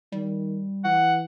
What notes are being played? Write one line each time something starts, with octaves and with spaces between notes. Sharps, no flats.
D#3 G3
E3 F#5